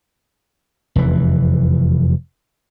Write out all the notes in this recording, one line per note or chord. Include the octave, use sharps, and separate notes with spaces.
F1 E2 E3